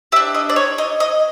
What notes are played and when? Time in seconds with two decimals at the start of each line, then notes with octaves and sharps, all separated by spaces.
0.12 G4 E5
0.16 D4
0.35 D#5
0.49 D5
0.56 C#5
0.78 D#5
1.00 D#5